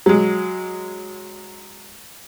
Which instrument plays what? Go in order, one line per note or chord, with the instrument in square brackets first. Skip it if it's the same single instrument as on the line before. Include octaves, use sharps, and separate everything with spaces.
[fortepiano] F#3 G#3